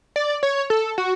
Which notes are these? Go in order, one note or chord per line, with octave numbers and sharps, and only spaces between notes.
D5
C#5
A4
F#4